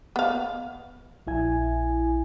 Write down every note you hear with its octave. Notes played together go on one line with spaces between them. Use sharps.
B3 F5
A#1 E4 G#5